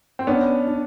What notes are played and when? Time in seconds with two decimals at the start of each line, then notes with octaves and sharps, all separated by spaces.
0.19 C4
0.27 B3 C#4 D4
0.67 D4